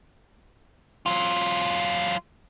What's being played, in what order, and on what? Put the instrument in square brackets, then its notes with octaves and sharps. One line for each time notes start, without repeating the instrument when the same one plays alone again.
[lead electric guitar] F#3 F4